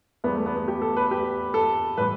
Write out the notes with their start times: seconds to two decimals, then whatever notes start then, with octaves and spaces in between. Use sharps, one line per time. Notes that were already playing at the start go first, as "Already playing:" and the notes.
0.24 E2 E3 G3 B3
0.35 A3
0.46 B3
0.56 B3
0.68 G4
0.82 A4
0.97 B4
1.11 G4
1.54 A4
1.97 A2 E3 G3 B4